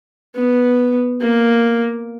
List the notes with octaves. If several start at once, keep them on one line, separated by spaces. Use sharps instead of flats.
B3
A#3